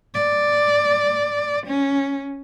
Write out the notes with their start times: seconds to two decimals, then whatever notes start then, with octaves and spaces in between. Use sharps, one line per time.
0.15 D5
1.67 C#4